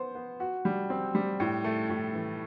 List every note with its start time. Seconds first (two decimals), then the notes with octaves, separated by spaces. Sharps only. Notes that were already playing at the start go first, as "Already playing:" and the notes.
Already playing: B3 C5
0.15 B3
0.40 F#4
0.65 G3
0.90 C4
1.15 G3
1.40 A2
1.64 A3
1.90 A2
2.14 E3